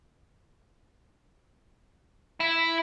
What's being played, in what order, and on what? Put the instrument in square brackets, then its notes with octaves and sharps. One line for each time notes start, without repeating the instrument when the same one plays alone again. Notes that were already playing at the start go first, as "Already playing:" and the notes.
[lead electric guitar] E4